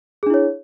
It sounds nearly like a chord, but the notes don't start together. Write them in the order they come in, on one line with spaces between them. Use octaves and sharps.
G#4 D4 E4 C#5